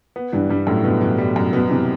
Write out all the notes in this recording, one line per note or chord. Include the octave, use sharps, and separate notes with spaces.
B3
G2 E3
G2 G3
F#2 A2
B2 B3
E3
G3
F#2
B2 B3
C3 E3